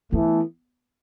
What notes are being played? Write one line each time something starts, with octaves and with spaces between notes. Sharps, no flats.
E3 A3 B3